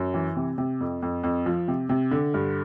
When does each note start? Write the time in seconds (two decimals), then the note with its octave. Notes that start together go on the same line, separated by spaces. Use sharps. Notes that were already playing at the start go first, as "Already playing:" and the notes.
Already playing: F#2
0.14 E3
0.36 C3
0.58 C3
0.80 F2
1.02 F2
1.23 F2
1.46 F3
1.68 C3
1.89 C3
2.11 D3
2.34 G2